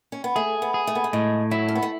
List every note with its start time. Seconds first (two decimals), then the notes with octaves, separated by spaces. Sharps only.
0.12 C#4
0.24 B3
0.36 A3 G#4
0.62 B3
0.74 G#4
0.87 A3
0.95 B3
1.04 A3
1.13 A2 G#3
1.51 F#3 E4
1.68 C#4
1.75 B3
1.83 A3